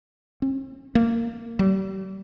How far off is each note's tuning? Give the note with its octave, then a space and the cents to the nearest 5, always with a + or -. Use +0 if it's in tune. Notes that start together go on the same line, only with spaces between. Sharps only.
C4 +45
A#3 -15
G3 -35